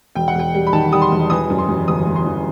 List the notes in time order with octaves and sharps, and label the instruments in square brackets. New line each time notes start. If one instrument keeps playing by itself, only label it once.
[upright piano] E1 G5
F#5
E1 G5
G3
B5
D#3 A5
G3 D#6
C6
E1
E3 D#6
F#2
C6
F#2
G1 D#6
G1
C6
E3